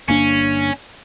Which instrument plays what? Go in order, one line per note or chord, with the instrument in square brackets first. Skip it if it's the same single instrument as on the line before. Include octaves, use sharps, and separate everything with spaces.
[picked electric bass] G1 A#3 D4 [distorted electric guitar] C#4